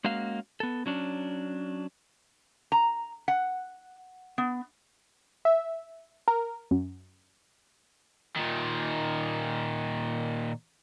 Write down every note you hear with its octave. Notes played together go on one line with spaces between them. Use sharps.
G#3 A#3 C#4 F#4 F5
B3 A4
F#3 C#4 D4
A#5
F#5
B3
E5
A#4
F#2
A#2 D#3